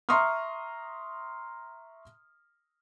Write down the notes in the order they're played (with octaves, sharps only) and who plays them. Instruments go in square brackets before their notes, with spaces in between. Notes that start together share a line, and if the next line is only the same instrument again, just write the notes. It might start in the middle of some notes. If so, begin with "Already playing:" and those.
[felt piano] E5 A#5 C6 C#6 D#6 F6